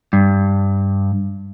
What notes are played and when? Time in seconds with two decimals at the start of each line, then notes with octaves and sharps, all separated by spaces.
0.13 G2